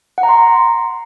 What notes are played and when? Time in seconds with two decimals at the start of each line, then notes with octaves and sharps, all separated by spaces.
0.18 F#5
0.23 A#5
0.29 C6